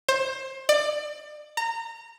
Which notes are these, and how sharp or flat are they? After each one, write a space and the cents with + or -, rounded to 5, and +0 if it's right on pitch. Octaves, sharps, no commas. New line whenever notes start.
C5 +20
D5 +30
A#5 -25